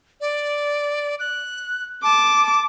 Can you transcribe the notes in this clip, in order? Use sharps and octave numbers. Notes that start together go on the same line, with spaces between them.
D5
F#6
A5 D6